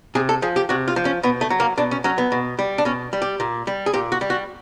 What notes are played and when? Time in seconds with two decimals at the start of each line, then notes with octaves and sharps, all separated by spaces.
0.15 C3 G#4
0.29 A4
0.42 F3 G#4
0.56 G4
0.69 C3 F#4
0.88 F4
0.96 F3
1.05 C#4
1.23 B2 B3
1.41 A3
1.50 F#3
1.60 A#3
1.77 B2 D4
1.91 C#4
2.04 F#3 C#4
2.18 B3
2.32 B2
2.59 G3
2.78 D4
2.85 B2 C#4
3.13 G3
3.22 G4
3.40 A#2
3.67 G3
3.86 G#4
3.93 A#2 G4
4.12 F#4
4.21 G3
4.30 F#4